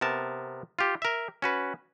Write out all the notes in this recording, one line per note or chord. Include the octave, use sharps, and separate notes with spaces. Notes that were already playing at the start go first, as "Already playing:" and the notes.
C3 B3 A#4 A5
F4 G4
A#4 E5
C#4 F#4 B4